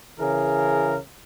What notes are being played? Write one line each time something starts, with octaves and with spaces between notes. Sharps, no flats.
C#3 E3 G#4 A#4